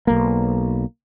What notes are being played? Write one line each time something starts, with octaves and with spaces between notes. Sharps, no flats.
B1 A#3